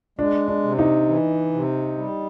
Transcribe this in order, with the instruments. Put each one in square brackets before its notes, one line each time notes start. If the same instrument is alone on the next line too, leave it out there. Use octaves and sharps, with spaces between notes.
[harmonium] G#3 [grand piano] D4
[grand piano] D4
[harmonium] C3
[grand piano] D#4
[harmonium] E3
C3
G3